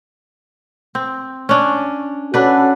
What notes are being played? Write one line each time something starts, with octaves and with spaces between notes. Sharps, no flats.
C4
C#4 D4
C#4 D4 F#4 A4 B4